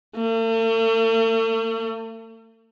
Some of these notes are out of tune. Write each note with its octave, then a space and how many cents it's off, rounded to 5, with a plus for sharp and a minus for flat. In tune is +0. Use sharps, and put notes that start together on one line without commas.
A3 +45